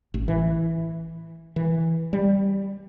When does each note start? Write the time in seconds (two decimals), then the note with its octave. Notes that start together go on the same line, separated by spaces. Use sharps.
0.14 A1
0.28 E3
1.56 E3
2.13 G3